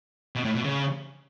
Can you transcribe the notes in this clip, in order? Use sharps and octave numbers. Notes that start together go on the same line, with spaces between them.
B2
A2
B2
C#3